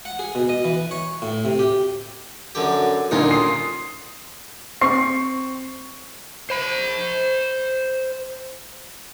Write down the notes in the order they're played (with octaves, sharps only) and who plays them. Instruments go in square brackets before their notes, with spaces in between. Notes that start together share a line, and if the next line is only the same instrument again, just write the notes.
[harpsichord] F#5
G#4
B2
D#5
E3
C#5
A2
C3
G4
F#2 D3 G4
[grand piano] D#1 D3 D#4 [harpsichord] C#4 F4 A#4
[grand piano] C6 D#6 C7
[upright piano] C4 C#6 C7
[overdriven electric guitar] C5 B5